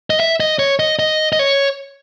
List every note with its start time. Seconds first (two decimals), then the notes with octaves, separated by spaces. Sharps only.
0.10 D#5
0.20 E5
0.40 D#5
0.59 C#5
0.79 D#5
0.99 D#5
1.33 D#5
1.39 C#5